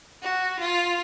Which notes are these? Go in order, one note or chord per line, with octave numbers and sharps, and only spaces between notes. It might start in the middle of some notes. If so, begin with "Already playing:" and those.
F#4
F4